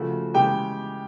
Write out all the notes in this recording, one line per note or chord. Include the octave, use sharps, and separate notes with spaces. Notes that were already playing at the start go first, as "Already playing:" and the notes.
Already playing: C#3 F3 A3 F#4
C#3 E3 G#3 G4 G5